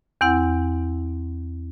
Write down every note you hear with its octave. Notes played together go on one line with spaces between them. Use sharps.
E2 C4 E4 F#5